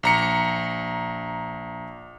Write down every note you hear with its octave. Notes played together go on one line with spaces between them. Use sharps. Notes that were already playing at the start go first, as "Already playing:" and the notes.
A#1 A#5 C#7